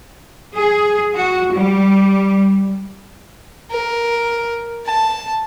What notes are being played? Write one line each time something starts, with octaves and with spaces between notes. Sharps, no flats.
G#4
F#4
G3
A#4
A5